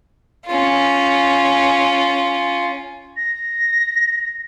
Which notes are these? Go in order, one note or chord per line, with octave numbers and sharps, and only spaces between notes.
C#4 F4
A#6